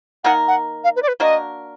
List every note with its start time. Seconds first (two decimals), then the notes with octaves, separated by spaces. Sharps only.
0.24 D#3 A#3 D#4 A#4 F#5
0.48 F#5
0.84 F5
0.96 B4
1.02 D5
1.08 B4
1.20 A#3 D4 F#4 A#4 D#5